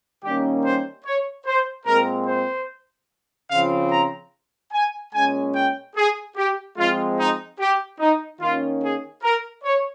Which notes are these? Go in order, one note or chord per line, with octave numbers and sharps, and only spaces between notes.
D#3 G3 A#3 C#4 G4
C5
C#5
C5
A#2 G#3 C4 A#4
C5
C#3 F3 C4 F5
A#5
G#5
A#2 G#3 C#4 G#5
G5
G#4
G4
F3 G#3 C4 F4
D#4
G4
D#4
D#3 A#3 C#4 F4
G#4
A#4
C#5